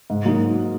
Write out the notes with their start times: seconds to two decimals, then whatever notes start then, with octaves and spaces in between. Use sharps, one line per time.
0.10 G#2
0.25 F#3 A#3 D#4